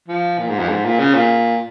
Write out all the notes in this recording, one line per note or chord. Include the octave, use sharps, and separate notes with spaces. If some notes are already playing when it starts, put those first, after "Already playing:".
F3
A#2
G#2
F2
G#2
A#2
C#3
A#2